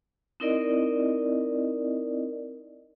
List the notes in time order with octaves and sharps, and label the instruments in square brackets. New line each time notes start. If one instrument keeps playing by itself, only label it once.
[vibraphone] C4 D#4 E4 A#4 D5 D#5